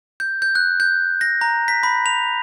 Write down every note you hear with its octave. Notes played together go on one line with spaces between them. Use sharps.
G6
G6
F#6
G6
A#6
A#5
B6
B5
F7